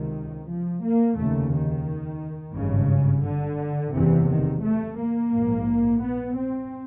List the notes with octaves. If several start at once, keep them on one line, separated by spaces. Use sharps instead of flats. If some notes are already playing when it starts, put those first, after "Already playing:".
Already playing: C#2 C3 D#3
F3
A#3
F1 D#2 C#3 A3
D#3
G#1 G2 C#3
D3
F#1 E2 C3 E3
D#3
A3
A#3
A#1 G#2
B3
C4